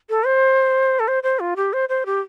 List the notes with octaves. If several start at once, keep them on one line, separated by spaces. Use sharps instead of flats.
A4
C5
A4
C5
C5
F4
G4
C5
C5
G4